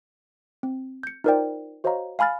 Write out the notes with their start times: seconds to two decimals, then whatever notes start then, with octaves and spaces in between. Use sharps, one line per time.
0.63 C4
1.03 G6 C#7
1.24 D#4 F4 A#4 C5 D5 G5
1.84 F#4 C5 C#5 D#5 F5 A#5
2.19 F5 G#5 B5 F6 A6